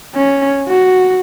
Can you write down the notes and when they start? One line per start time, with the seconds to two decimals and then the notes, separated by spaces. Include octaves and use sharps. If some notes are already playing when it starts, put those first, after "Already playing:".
0.15 C#4
0.68 F#4